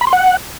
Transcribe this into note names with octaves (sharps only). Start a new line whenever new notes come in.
B5
C6
F#5